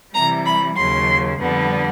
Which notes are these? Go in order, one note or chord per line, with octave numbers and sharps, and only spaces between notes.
C3 E3 G3 A#5
B5
D#2 C#3 F#3 C6
F2 D3 G3 B3